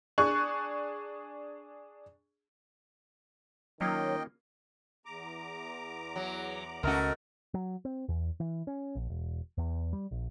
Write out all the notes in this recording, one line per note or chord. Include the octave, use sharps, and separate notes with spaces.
D4 G#4 C#6 F#6
D#3 F#3 A#3 C#4 F4 D#5 G5
E2 A#5 D6
F#3
C#2 B2 A3 C#4 F#4 A#4
F#3
C4
E2
E3
C#4
A#1
E1
E2
G3
A#1